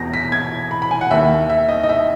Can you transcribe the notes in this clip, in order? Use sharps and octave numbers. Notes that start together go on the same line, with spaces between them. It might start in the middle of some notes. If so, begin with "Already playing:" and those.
Already playing: E1 E2 B2 A#6
B6
G#6
B5
B5
G#5
F#5
D#2 D#3 E5
E5
D#5
D#5
E5